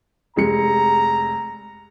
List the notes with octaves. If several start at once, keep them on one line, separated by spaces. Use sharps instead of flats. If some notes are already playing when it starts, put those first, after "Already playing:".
F1 G#3 A#5 C#7